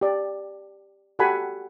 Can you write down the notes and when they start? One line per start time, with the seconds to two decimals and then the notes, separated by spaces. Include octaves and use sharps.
0.01 G4 D5
1.19 F#4 G4 A4 F#5 G#5 B5